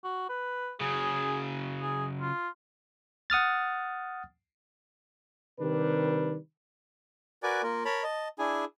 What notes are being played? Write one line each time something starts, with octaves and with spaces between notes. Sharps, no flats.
F#4
B4
C#3 F#3 G#4
G#4
F4
F#5 D#6 F6 A6
C3 D#3 G3 D4 B4
F#4 A#4 B4 D5 G#5 D6
A#3 F4 A#4
A#4 C#5 A5 B5
D#5 A5
D4 E4 G#4 G#5